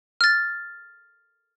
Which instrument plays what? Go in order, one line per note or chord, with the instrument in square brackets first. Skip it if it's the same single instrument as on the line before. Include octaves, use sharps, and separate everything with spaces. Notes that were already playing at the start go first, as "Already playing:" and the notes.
[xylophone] F6 A6